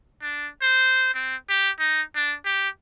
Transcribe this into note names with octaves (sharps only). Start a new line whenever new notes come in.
D4
C5
C4
G4
D#4
D4
G4